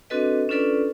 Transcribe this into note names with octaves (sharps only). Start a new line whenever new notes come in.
C4 D4 F#4 A4 B4 D#5
C#4 D4 F4 A4 B4 D5